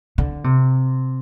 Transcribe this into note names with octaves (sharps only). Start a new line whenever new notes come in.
D3
C3